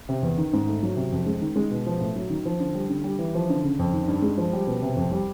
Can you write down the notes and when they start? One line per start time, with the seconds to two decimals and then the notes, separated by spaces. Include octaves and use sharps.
0.09 C3
0.23 E2
0.38 D#3
0.53 G#2
0.67 A3
0.83 F#3
0.97 C3
1.12 F2
1.26 G#3
1.42 D#3
1.56 G#3
1.71 B2
1.86 F3
2.01 A2
2.16 F#3
2.30 D#3
2.45 F3
2.60 D3
2.75 G3
2.89 D3
3.04 G3
3.19 E3
3.35 F3
3.49 D3
3.64 C#3
3.79 F2
3.93 D#3
4.08 G2
4.22 G#3
4.38 F3
4.53 G3
4.67 B2
4.82 C3
4.96 F2
5.11 G3